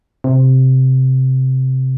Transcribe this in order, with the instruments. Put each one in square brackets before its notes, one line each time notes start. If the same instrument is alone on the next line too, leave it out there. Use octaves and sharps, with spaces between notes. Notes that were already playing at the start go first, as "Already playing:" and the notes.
[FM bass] C3